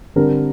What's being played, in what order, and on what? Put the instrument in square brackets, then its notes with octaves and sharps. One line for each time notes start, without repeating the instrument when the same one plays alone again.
[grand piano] D3 G3 C4 A#4